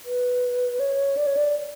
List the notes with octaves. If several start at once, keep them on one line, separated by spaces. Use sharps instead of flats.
B4
C#5
D5
C#5
D5